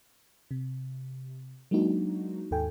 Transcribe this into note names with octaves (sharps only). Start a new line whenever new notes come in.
C3
F#3 G#3 A#3 D4 D#4 F#4
D#2 G#2 A4 G5 G#5